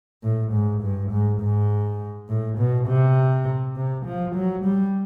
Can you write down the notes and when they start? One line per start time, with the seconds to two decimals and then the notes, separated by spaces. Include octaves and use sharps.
0.23 A2
0.53 G#2
0.82 G2
1.11 G#2
1.41 G#2
2.29 A2
2.58 B2
2.88 C3
3.76 C3
4.06 F3
4.35 F#3
4.65 G3